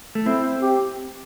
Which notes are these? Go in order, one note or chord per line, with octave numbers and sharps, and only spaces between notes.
A3
C4 E4
G4